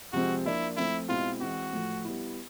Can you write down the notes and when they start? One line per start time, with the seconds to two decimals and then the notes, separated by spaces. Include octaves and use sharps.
0.13 C3 F3 G#3 C4 F#4
0.45 F3 A#3 D4 E4 F4
0.77 F3 A3 C4 E4
1.08 B2 G#3 C4 E4 F4
1.41 E3 G#3 C4 F#4
1.72 A2 F3 A3
2.05 G3 B3 E4